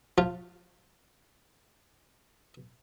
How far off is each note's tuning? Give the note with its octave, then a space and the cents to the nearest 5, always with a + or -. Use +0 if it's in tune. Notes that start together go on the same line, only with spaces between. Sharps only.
F3 +30 F4 -5